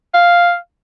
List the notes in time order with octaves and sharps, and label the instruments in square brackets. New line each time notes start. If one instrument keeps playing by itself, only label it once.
[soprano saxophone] F5